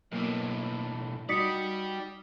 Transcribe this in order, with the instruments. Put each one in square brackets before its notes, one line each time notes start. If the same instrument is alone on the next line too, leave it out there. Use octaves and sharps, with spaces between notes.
[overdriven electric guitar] B1 A2 [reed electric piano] F#3 A#3 B3
[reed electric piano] G3 D#4 F#4 [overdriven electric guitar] G4 D5 [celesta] D#6 B6 C#7